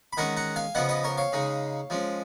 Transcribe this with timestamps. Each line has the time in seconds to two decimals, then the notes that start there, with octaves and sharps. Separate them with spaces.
0.13 B5
0.17 D#3 G#3 C#4 F#5 A#5
0.37 F#5 A#5
0.56 F5 G#5
0.75 C#3 F3 B3 D#5 F#5
0.89 B4 D#5
1.04 A#4 C#5
1.18 C#5 F5
1.33 C#3 G#3 D#4
1.90 F3 G#3 C#4